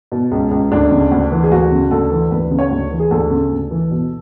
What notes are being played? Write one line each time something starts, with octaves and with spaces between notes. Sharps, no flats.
B2
C#2
C#2
D2 D4
C#3
D2
E3
G#4
D2 F#4
C#3
D2 A4
E3
D2 B4
C#3
C#5
D2
E3
G#4
D2 A4
C#3
D2
E3
B2